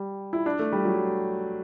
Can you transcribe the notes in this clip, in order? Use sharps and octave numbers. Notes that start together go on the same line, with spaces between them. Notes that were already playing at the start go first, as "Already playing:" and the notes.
Already playing: G3
E4
D4
A3
G3
F#3